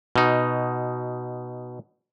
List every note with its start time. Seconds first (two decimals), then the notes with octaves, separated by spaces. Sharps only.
0.16 B2 D#4